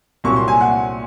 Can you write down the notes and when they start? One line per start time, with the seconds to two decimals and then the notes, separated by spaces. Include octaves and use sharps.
0.24 C2 A#2 F#3 C4 C#6
0.36 C6
0.48 G#5
0.61 F#5